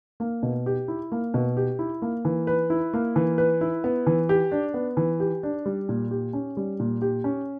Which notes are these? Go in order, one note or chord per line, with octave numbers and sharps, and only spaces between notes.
A#3
B2
G4
E4
A#3
B2
G4
E4
A#3
E3
B4
E4
A#3
E3
B4
E4
B3
E3
G4
D4
B3
E3
G4
D4
G3
A#2
G4
C#4
G3
A#2
G4
C#4